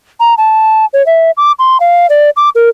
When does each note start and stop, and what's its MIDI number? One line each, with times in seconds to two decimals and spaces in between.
0.20 0.34 82
0.38 0.85 81
0.93 1.05 73
1.06 1.31 76
1.37 1.52 86
1.59 1.78 84
1.80 2.07 77
2.10 2.30 74
2.36 2.49 86
2.55 2.69 70